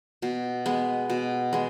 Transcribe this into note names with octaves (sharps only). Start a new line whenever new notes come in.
B2
G#3 B3
B2
G#3 B3